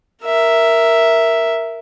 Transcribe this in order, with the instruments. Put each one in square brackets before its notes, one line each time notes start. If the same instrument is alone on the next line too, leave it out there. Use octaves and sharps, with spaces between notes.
[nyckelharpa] A#4 E5